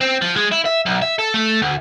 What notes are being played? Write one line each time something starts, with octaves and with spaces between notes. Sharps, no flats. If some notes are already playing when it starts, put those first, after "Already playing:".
C4
F3
G#3
E4
E5
B1
E5
A4
A3
D2